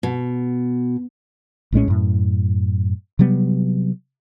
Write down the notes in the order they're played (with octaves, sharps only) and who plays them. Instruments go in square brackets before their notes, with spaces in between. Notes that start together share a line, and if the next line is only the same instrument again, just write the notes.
[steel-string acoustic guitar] B2
[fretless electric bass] A#1 A2 G#3 C#4
F#2 A2
C3 F#3 G3 B3